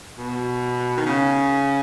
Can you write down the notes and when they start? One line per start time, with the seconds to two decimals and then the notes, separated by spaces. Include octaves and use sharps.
0.18 B2
0.97 D#3
1.06 C#3